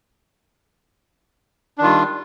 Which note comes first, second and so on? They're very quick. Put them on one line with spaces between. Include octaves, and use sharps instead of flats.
D4 D#3 F4 G3